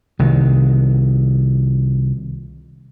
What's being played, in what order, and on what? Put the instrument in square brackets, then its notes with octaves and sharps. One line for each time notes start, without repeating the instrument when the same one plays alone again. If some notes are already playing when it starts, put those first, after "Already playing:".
[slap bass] C2 D#3